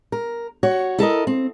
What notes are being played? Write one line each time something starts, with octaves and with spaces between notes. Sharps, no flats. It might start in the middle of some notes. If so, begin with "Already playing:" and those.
A#4
F#4 C#5
E4 A4 A#4 D#5
C4